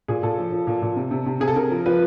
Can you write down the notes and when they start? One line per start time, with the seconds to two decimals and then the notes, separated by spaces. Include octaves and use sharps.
0.08 A#2 G#4
0.23 A#2 A4
0.37 F3
0.52 F3
0.67 A#2
0.82 A#2
0.96 C3
1.11 C3
1.26 C3
1.40 C3 G#4
1.48 A4
1.56 C3 A#4
1.70 F3
1.86 F3 B4